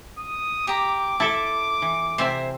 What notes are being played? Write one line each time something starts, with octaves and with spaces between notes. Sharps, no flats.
D#6
G4 A#5 D6
E4 A4 E5 A5
E3
C3 C4 C5 E5 G#5